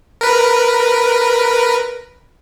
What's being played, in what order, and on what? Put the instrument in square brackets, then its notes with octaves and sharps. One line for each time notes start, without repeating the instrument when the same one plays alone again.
[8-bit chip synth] A#4 B4